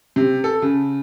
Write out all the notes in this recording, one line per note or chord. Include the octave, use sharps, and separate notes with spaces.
C3
A4
C#3